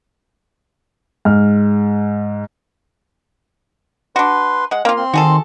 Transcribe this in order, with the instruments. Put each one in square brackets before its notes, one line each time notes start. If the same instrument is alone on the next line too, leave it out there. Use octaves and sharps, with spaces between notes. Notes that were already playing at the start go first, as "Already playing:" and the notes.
[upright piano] G#2 F6
[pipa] D4 F#4 [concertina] B4 C6
[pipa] G#3 F#5
[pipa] A#3 F4 [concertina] C4 F5
[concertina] C4 C6
[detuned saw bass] D#3 [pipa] F#4 G#4 A4